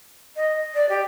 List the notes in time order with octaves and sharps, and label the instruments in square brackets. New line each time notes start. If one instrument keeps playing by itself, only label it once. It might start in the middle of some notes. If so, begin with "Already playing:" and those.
[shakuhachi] D#5
D5
G4